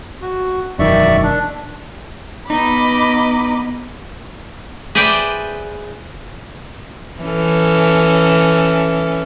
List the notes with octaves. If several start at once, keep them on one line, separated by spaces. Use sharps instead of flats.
F#4
E1 F#2 D#3 D5 E5 C#6
D4
B3 D#4 D#5 B5 D6
G#4 B4 C5 D5 E5 G5
E3 C#4 A4